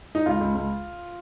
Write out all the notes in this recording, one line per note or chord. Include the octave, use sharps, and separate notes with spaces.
D#4
C#2 F4
C#2
C#2